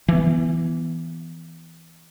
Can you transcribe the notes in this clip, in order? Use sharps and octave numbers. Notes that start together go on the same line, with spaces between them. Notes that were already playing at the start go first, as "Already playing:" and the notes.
E3 B3